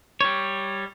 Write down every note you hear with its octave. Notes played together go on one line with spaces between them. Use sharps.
G3 C#5